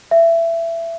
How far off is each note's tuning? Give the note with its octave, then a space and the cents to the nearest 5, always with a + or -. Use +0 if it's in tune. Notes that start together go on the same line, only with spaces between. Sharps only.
E5 +20